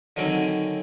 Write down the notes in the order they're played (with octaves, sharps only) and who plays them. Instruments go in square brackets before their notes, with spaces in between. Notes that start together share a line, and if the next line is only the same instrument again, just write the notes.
[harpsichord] D3 D#3 F#3 C4 C#4